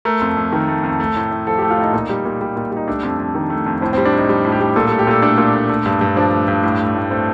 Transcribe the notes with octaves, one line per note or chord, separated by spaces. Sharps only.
A3 A#4
F2
F2
D#3
A3
F2
A3
A2
A2
F3 A4
G4
A3
F4
A2 D#4
A#2 D#4
G3
A#2
G3
A#2
G3 D#4
A3 D4
F2
F2
D#3
A3
F2
A2 C4
C4
G3
D4
A2 D#4
G3
A2
G4
G3
A#2 A4
A4
A3
G4
A#2 A4
A3 D4
A#2
A3
A3
G2
G2
F3 D4
A3
G2
A2
A3
A2
A3 C4